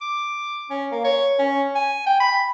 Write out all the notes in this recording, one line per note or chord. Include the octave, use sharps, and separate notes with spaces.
D6
C#4
A#3
C#5
C#4
G#5
G5
B5